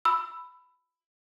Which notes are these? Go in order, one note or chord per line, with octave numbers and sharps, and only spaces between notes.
B5 E6